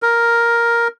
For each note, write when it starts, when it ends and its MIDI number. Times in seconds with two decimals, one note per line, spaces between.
0.03 0.88 70